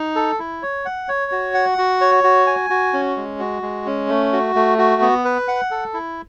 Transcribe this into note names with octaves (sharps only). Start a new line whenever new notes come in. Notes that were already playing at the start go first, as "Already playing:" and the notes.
Already playing: D#4
A4
E4
C#5
F#5
C#5
F#4
F#5
F#4
C#5
F#4
G#5
F#4
C#4
G#3
F#4
G#3
C#4
A3
F#4
A3
F#4
B3
B4
F#5
A4
E4